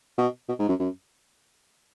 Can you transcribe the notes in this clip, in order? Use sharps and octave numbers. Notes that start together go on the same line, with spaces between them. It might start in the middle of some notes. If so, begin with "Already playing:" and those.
B2
B2
G#2
F#2
F#2